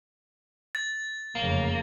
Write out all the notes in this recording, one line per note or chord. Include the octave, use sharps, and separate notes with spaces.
A6
F1 F#2 C#3 A#3